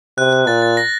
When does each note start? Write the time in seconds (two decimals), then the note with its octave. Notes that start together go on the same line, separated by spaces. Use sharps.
0.18 C3 F#6
0.33 F#6
0.47 A#2 A6
0.62 A6
0.77 A#6